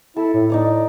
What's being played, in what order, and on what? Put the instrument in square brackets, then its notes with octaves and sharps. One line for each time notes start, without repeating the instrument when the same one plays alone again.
[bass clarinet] E4 [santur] A4
[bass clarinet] A2
[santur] D#4 D5 A#5